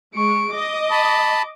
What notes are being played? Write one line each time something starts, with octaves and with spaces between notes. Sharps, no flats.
G#3 C#6 D7
D#5 D6
A5 B5